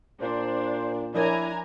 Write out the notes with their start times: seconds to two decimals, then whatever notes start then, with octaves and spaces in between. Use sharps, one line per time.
0.21 A#2 D4 C5
1.15 F3 D4 E4 A#4 C#5 G#5 A#5